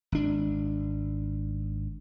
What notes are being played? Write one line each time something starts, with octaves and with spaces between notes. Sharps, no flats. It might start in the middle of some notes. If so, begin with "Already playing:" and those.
G#1 D4